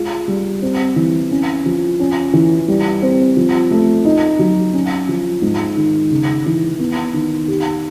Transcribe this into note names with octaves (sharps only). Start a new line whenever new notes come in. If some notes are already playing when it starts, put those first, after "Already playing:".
Already playing: G#3 F4
G3
C4
E3
C#4
F3
C#4
E3
G3
C4
F3
A3
D#4
F#3
C#4
F3
G#2
D#3
C#3
E3
B3
D#3
G4